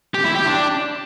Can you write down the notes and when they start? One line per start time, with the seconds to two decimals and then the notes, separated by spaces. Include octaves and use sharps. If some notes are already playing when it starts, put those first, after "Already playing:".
0.14 G4
0.25 E4
0.35 G4
0.46 D4